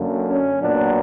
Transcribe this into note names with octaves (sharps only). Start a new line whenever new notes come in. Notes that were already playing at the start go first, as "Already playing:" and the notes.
Already playing: F#2 D3 A#3
C#4
A#2 F#3 B3 D4